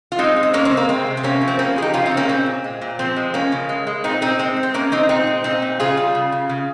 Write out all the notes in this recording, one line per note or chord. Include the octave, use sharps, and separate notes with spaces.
F4
G#3 C4 D#4
G#3
C4
G#3 A#3 C#4
C4
C#3
A#3
G#3 C4
C3
C4
C3 A#3 C#4
F3
C4
C#3 A#3 C#4
F3 G#4
D#4 G4
C#3 C#4 F4
C4 D#4
C#3
A#3 C#4
A#2 C4
A#2
G#3
A#2
F3 C4
G#3
F3 A#3 C#4
C#3
G#3
G#3
A#2 C4 D#4
A#2 C4 D#4
G#3 C4
G#3
C4
G#3 A#3 C#4
G#3 C4 D#4
A#2 C4 D#4
G#3
A#2 C4 D#4
A#2
C#3 F4 G#4
G3
C#3
C#3
C#3